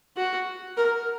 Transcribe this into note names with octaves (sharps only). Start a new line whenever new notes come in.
F#4
A#4